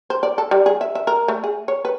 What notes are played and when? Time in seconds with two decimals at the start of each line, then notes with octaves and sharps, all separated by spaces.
0.10 C5
0.23 D5
0.38 A4
0.51 G3
0.66 G#4
0.81 E5
0.95 E5
1.07 A#4
1.28 A3
1.44 G#4
1.68 C#5
1.85 B4